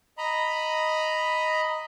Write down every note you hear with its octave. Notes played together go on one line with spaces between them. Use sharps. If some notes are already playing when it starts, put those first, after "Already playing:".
D#5 A#5 B5